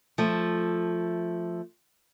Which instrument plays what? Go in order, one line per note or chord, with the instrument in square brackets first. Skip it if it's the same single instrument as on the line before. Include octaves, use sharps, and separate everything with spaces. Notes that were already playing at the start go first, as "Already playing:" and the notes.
[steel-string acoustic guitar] F3 A3